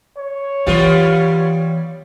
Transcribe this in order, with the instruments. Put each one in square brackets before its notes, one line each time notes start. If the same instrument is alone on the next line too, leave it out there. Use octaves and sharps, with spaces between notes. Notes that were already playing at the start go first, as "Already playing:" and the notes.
[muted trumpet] C#5
[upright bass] E3 F#3 [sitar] G3 B3 F4